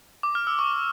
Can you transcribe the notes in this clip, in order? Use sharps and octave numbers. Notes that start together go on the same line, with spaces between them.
D6
F6
E6
C#6